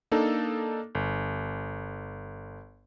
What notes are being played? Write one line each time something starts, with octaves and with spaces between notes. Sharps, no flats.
A#3 D4 D#4 A4
G1